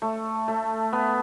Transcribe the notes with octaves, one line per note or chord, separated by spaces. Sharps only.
A3
A3
B3